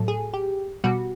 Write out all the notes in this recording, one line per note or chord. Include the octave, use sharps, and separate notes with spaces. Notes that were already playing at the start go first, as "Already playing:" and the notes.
Already playing: A2 F#3 A4
G#4
G4
B2 G3 F#4